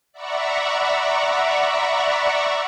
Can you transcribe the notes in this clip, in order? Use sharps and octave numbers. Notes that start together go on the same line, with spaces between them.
D5 E5 F#5 A#5 B5 C#6